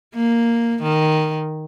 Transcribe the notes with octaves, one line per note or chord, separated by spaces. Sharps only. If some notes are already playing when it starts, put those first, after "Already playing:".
A#3
D#3